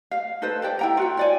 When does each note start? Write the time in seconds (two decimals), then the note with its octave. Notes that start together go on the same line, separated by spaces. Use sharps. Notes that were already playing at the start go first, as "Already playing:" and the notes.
0.11 F5
0.42 D#4 A4 B4 C5
0.62 G4 D5 G5
0.79 E4 G5 A#5
0.97 F4 F#4 G5
1.17 C#5 D5 G#5